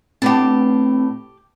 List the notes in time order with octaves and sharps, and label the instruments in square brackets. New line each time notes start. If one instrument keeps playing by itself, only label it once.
[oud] A2 B3 D4 [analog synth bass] C4 [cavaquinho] G4 A5